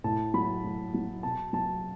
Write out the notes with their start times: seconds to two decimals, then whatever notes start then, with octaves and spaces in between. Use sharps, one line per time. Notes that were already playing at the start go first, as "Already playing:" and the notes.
0.04 A2 A5
0.34 F#3 B5
0.64 A2
0.94 F#3
1.23 B2 A5
1.53 F#3 A5